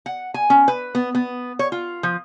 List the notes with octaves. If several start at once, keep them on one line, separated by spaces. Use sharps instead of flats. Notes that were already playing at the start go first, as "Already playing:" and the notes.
F#5
G#5
C#4
B4
B3
B3
C#5
F4
F3